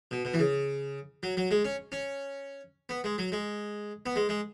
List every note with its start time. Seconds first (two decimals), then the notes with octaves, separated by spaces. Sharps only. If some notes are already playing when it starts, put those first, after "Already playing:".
0.11 B2
0.25 B2
0.34 E3
0.39 C#3
1.23 F#3
1.37 F#3
1.51 G#3
1.65 C#4
1.92 C#4
2.89 B3
3.04 G#3
3.18 F#3
3.32 G#3
4.06 B3
4.16 G#3
4.29 G#3